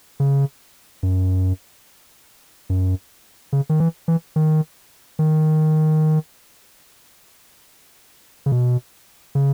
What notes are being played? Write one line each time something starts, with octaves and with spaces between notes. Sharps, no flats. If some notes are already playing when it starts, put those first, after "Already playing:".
C#3
F#2
F#2
C#3
D#3
E3
E3
D#3
D#3
C#3
B2
C#3